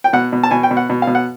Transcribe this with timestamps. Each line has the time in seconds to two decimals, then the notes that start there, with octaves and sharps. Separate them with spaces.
0.04 G5
0.13 B2 F#5
0.33 B2
0.43 A5
0.51 B2 G#5
0.63 G5
0.71 B2
0.77 F#5
0.90 B2
1.02 F5
1.07 B2
1.15 F#5